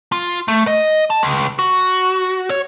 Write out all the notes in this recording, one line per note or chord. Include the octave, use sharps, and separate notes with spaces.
F4
A3
D#5
A5
C#2
F#4
C#5